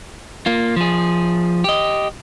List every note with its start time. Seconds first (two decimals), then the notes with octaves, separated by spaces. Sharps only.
0.46 A#3 F4
0.76 F3 G#4
1.64 G4 D#5